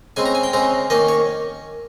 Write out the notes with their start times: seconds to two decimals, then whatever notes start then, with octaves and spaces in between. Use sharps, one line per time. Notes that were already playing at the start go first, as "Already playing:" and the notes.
0.16 C#3 G#3 C4 G#5
0.26 A#5
0.35 G#5
0.43 G5
0.53 C#3 G#3 C4 A#5
0.90 D#3 A#3 C#4 D#5
1.08 C#5